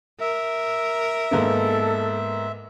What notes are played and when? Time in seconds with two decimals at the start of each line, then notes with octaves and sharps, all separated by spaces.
0.21 A#4 E5
1.31 G#2 A#3 B3 A4